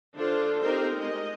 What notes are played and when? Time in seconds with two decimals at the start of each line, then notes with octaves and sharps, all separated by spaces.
0.14 D3 D4 F4 A4 C5
0.60 C4 D#4 G4 A#4 C5
0.93 G#3 D#5